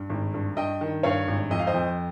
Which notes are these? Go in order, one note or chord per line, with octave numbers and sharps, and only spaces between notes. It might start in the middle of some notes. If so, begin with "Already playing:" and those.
Already playing: G2
G#1
G2
G2 D#5 G5
D#3
G2 C#5 F5
G#1
F2 D#5
F5
C5 D#5
F2